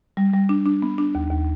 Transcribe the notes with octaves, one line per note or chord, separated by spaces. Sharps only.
G3
G3
D4
D4
B3
D4
D#2
D#2